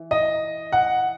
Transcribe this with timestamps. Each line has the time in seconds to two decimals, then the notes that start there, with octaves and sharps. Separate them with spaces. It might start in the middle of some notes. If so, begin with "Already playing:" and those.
Already playing: E3
0.11 D#5
0.72 F#5